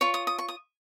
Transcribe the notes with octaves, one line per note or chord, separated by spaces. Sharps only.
F4 C#5 C#6
D#6
D#6
C#6
D#6